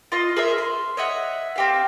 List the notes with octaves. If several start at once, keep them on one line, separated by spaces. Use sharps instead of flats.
F4 D#5 E6
G#4 A#4 C5 E5
C6
C#5 D#5 E5 F#5
C4 G4 F5